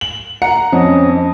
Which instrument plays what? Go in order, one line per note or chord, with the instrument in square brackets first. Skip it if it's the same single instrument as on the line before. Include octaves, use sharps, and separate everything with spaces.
[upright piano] F#7
F#5 A#5 C#7
[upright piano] F2 [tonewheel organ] C4 C#4 D#5